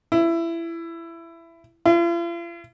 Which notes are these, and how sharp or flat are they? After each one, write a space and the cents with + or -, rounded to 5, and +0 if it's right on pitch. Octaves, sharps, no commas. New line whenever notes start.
E4 +20
F4 -45